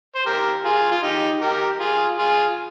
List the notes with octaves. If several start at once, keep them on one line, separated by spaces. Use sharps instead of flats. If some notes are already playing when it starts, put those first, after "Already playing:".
C5
G4 A#4
F4 G#4
F4
D#4 G4
G4 A#4
F4 G#4
F4 G#4